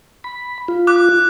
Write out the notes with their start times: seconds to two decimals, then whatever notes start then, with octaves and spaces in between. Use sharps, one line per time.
0.24 B5
0.68 F4
0.87 D6 F#6